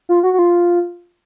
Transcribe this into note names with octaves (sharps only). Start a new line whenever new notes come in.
F4
F#4
F#4
F4